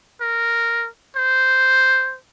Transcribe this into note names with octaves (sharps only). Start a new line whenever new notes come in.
A#4
C5